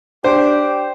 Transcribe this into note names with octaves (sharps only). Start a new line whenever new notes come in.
D4 G4 C5